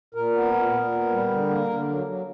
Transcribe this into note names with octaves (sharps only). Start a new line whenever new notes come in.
A#2 A#4
B3
A#2
A#2
B3
G3
D3
A#3
D3
F#3
F#3